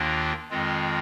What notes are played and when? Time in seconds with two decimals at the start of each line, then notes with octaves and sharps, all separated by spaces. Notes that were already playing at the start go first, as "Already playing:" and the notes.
Already playing: D#2 D#3 A#3 D4 F4
0.50 F2 D#3 G#3 C4 F4